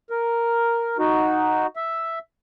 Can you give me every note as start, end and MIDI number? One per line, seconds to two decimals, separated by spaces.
0.10 0.97 70
0.99 1.67 63
0.99 1.67 66
1.76 2.19 76